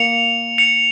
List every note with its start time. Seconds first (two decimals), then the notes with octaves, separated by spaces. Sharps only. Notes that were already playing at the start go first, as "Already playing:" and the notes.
Already playing: A#3 C#7 F7
0.58 C#7 F7